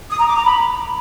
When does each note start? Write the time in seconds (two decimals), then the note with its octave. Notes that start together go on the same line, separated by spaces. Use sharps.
0.10 D#6
0.18 A#5
0.27 D6
0.36 A#5
0.44 B5